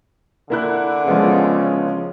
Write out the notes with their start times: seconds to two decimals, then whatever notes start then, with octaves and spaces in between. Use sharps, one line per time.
0.50 D3 A#3 E4 F#6
1.06 C#3 F3 G#3 B3